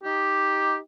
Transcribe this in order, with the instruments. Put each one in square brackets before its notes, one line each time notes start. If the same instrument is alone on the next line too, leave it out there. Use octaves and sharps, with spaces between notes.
[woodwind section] D#4 G4